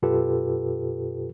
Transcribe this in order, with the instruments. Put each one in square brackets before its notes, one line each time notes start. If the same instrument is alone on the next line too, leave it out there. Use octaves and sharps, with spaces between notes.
[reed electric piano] F#2 B2 F4 G4 A4 B4